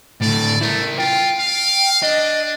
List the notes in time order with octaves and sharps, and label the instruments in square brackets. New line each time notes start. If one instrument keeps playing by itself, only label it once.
[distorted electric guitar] A2 D3 [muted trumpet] D5
[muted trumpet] A3 [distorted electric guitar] E4 A#4
[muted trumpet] F4 [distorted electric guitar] G5
[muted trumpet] F5
[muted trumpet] D4 [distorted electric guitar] D#5